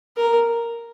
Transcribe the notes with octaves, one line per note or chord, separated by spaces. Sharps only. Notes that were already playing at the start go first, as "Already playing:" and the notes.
A#4